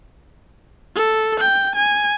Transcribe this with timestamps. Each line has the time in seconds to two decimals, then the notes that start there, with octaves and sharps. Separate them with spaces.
0.96 A4
1.40 G5
1.75 G#5